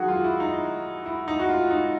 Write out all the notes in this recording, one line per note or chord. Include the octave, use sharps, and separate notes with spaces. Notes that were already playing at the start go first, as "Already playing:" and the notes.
Already playing: F#2 D#3 F#3 F#4 G#4
F4
E4
D#4
E4
D#4
F#4
F4
D#4